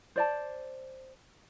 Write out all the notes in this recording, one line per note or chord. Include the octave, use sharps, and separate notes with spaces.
C5 D5 A5